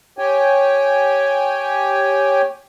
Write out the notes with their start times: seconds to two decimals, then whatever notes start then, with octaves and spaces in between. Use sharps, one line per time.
0.19 G4 C#5 G5 G#5